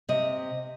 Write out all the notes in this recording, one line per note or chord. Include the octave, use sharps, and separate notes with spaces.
C3 D#5